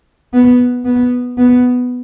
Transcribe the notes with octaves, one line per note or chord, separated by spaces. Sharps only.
B3
B3
B3